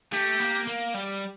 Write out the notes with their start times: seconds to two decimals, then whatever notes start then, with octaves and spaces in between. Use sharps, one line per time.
0.12 A3 G4
0.40 A#3
0.68 A#3
0.94 G3